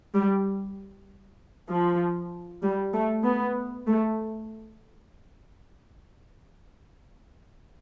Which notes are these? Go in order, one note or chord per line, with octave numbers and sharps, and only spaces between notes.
G3
F3
G3
A3
B3
A3